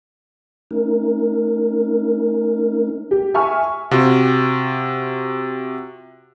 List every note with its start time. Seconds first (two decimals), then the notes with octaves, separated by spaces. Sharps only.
0.71 A3 C#4 D#4 A#4
3.11 G4
3.34 E5 G#5 C#6 F6
3.91 C3 F4 F#4